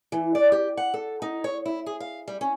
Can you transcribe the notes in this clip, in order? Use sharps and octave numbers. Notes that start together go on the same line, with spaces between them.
E3
D5
G4
F#5
A4
D#4
C#5
E4
G#4
F5
G3
C#4